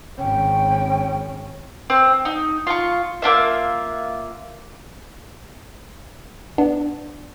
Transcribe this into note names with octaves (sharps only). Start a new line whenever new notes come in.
G#1 C#4 G5
C4
D#4
F4 C#6
A#3 D4 F4 E5
B3 D4